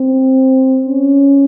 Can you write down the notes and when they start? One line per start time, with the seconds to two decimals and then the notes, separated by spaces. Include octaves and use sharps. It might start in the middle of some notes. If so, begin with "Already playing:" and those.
Already playing: C4
0.86 C#4